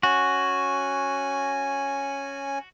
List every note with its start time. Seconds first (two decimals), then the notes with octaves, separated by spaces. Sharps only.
0.03 C#4 F#4 G#5